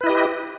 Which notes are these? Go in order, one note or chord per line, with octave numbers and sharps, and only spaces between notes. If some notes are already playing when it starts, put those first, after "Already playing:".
E4 G4 B4 D#5